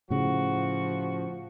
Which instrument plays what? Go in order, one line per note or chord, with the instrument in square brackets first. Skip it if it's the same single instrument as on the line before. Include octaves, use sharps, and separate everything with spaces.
[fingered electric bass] A2 C#3 [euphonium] F3 [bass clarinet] F#4